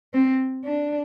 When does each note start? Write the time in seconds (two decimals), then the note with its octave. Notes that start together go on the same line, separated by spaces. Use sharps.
0.14 C4
0.65 D4